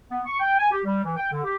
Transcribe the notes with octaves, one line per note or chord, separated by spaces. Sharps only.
B3
C#6
G5
G#5
G4
G3
E3
G5
D3
G4